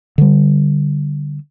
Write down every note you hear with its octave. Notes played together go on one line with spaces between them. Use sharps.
D3 G3